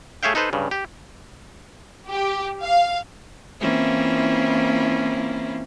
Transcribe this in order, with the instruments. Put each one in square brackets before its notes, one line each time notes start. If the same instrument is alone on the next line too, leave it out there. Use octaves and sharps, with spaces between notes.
[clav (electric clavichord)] A3 G#4 C#5 E5 F5 G5
D#4 A4 B4 C5
G2 C#3
G4
[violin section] G4
F5
[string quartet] E3 A#3 C4 C#4 E4 F4